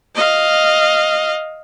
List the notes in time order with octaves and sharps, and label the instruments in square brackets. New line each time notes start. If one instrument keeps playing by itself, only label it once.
[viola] D#5 F5